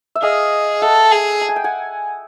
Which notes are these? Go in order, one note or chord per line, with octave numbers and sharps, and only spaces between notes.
E5
G#4 D#5 F5
A4 E5 F#5
G#4
A5
G#5
G5
F#5 G#5